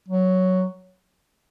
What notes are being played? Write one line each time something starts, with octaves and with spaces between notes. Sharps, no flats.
F#3